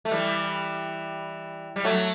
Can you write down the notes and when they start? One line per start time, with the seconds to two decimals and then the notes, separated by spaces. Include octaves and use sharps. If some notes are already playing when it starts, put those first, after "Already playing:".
0.05 A3
0.11 E3 G3
1.76 G3
1.84 F#3 A3